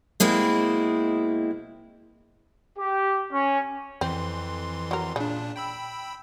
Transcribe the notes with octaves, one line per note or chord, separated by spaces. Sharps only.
B2 G#3 A#3 C4 E4
G4
C#4
F2 E3 C4 C6
F#3 A#4
A#2 C#3 D4
G5 B5 E6